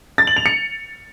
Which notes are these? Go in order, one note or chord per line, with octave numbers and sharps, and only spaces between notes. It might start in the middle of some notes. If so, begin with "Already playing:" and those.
A6
F#7
F7
C#7